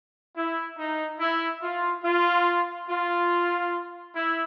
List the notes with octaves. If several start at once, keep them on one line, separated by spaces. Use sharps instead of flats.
E4
D#4
E4
F4
F4
F4
E4